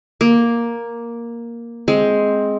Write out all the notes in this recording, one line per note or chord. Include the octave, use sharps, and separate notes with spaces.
A#3
G#3 C4